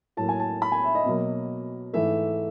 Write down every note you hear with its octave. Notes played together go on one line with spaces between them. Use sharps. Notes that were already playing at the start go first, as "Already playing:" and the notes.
A2 F#3 A#3 A5
G#5
A5
B5
G#5
E5
D#5
B2 F#3 A#3
G#2 E3 A3 E5